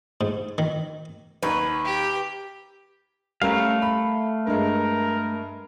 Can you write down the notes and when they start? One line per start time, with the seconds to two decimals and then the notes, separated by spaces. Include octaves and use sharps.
0.21 G#2
0.58 D#3
1.43 D#2 D#3 B4
1.85 G4
3.42 G3 A3 C#4 A#4 F5
3.82 B5
4.47 G2 G#3 A#4